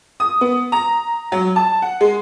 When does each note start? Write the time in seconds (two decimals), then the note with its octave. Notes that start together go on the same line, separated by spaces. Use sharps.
0.20 D#6
0.41 B3
0.72 A#5
1.32 F#3
1.56 A5
1.82 F#5
2.01 G#3